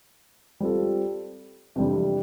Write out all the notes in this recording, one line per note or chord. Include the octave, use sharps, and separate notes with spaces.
G3 C4 F4 A4
F2 C3 E3 G3 D4